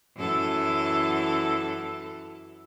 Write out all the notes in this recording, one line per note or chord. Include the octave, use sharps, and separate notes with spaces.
F#2 E3 A4